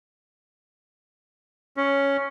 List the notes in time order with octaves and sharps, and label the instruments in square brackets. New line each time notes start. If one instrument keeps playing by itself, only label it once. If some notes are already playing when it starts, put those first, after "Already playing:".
[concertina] C#4